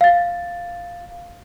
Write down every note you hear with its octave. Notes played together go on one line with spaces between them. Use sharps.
F5 A6